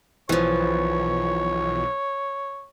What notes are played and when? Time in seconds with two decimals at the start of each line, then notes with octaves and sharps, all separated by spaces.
0.29 B1 E3 F3 C#5